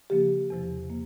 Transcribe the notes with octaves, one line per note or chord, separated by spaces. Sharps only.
C#3 F3 A#3 G4
E2 C3 F3
A#3